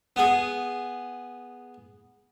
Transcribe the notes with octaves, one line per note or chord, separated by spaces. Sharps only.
B3 G#4